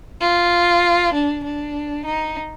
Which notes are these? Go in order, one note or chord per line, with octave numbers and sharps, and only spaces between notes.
F4
D4
D4
D#4